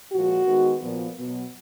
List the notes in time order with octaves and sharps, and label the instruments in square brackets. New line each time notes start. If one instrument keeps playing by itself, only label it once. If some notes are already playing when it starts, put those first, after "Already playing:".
[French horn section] A#2 F3 G#3 F#4
D#3 G#3 B3
A#2 F3 B3
B2 F#3 B3